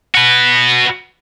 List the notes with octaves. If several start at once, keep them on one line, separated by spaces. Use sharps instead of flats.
F#4 B4